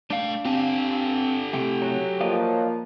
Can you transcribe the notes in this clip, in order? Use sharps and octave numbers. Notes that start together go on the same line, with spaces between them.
A3 D4 F5 G5
C4 G4 A4
A2 C3 A3 G5
F#3
F3 A#3 D5 D#5 F5